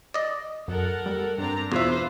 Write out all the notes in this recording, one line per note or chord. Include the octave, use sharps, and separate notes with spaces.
D5 D#5
F#2 A4 A#4 F#5
G3
G2 C4 D4 A#5
E2 B2 F4 B4 C5 E5